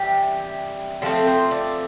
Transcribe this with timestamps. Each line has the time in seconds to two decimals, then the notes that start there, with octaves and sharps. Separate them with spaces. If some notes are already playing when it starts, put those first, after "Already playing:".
Already playing: C3 E3 G3 G4
1.02 D3 F3 A3 C4 A4
1.27 C5
1.51 D5